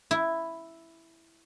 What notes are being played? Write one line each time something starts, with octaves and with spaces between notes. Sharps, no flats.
E4